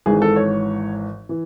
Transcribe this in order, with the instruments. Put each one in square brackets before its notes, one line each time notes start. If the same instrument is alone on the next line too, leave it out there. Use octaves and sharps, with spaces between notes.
[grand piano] G#1 G#2 E3 G#4
A4
C#5
E3